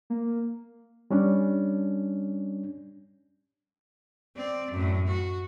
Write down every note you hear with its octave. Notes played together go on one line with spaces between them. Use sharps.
A#3
G3 C#4 D4
C4 D5
F#2 A2
F#4